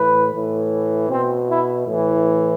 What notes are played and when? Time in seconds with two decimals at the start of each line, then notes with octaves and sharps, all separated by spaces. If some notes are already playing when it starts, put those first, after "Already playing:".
Already playing: A2 E3 B4
0.31 A2 E3
1.09 B2 C4
1.48 E4
1.87 A2 E3